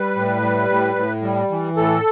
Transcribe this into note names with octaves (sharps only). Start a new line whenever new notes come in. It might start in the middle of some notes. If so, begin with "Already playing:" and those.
Already playing: G3 B4
A2
G3
A2
A2
G3
E3
A2 A4